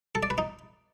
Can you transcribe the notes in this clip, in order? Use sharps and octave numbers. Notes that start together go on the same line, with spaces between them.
A4
D5
B4
D#4